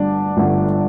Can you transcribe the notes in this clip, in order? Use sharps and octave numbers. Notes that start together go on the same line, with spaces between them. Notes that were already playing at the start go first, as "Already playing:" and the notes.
Already playing: G1 G2 D3 D4 D5
G1 G2 D3